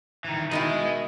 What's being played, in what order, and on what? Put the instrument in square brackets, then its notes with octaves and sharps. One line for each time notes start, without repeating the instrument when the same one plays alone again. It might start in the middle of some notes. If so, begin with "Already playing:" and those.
[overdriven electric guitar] D#3 E3
[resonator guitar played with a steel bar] B2 D#3 E4 [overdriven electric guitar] G#4 D#5